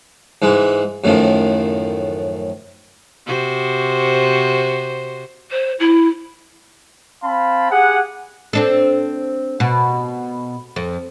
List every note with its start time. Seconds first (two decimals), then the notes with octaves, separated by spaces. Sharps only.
0.42 G#2 E3 G#3
1.04 F#2 A2 D#3 F3
3.27 C3 F#4 C5
5.51 C5
5.79 E4
7.24 C4 F5 A5 B5
7.72 G4 G#4 F#5
8.53 C4 D4 A4
9.60 B2
10.76 F2